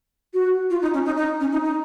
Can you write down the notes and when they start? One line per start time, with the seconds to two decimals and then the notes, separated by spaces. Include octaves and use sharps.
0.34 F#4
0.70 F4
0.82 D#4
0.94 C#4
1.06 D#4
1.17 D#4
1.40 C#4
1.52 D#4
1.64 D#4